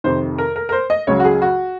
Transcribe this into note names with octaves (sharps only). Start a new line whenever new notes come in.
F2 C3 D#3 C5
A#4
A#4
A#4
C5
D#5
C#2 C#3 F#3 C#5
F#4
G#4
F#4